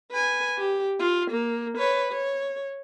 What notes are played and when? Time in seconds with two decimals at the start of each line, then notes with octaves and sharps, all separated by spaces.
0.12 B4 G#5
0.58 G4
1.00 F4
1.31 A#3
1.78 B4 C#5
2.12 C#5